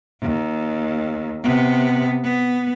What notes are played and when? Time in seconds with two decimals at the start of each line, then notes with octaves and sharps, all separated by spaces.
0.22 D#2
1.43 C3 B3
2.24 B3